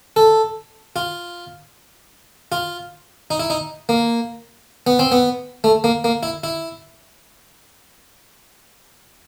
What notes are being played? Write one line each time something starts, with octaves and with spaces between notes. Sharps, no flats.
A4
F4
F4
D#4
E4
D#4
A#3
B3
C4
B3
A3
A#3
A#3
E4
E4